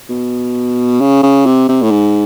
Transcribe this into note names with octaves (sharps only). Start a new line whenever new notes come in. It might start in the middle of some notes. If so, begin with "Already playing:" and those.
B2
C#3
C#3
C3
C3
A2
G#2